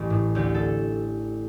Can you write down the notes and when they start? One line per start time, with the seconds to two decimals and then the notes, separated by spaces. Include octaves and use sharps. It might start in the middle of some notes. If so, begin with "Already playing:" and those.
Already playing: A1 E3 G4 A4 B4
0.10 A2
0.35 D2 G4
0.54 A4